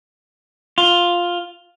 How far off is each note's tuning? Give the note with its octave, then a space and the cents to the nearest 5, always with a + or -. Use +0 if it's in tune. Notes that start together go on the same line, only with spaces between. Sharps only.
F4 +5